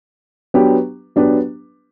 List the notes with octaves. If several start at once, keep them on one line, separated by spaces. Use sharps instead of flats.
F#3 B3 D4 G4 B4
F#3 B3 D4 G4 B4